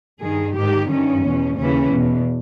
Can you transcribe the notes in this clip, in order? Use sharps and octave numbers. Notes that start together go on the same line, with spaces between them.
G2 D#3 G#4
G#2 D#3 G4
G2 D#3 C#4
E2 B2
D#2 C#3 E3 C#4
E2 B2